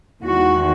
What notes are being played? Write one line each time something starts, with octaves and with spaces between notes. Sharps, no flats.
E2 D#3 G#3 F#4